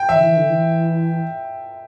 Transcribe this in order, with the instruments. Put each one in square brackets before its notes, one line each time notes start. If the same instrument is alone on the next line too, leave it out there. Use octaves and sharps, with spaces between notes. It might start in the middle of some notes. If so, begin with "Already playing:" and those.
Already playing: [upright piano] G5
[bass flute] E3 [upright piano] E5
[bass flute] D3
E3
D3
E3